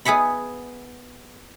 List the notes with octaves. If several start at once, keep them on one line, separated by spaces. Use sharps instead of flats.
B3 G#4 E5 F#5 B5